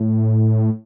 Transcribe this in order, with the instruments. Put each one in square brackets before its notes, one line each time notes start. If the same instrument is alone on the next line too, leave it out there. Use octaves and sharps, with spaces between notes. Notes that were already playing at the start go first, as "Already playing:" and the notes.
Already playing: [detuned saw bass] A2